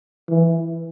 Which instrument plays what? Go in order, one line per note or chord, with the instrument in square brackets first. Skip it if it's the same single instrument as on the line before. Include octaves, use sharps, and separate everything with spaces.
[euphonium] E3